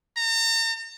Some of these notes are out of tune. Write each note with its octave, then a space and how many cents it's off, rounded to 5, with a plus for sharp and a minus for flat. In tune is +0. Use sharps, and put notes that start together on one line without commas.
A#5 -40